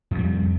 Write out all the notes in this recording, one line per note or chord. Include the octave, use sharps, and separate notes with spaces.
F2 C3 G3